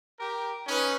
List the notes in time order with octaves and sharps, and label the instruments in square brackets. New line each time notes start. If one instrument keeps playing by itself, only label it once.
[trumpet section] G4 A#4
[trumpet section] C#4 [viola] D#4 B4